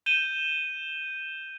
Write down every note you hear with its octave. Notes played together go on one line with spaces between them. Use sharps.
G6 D#7 E7 G7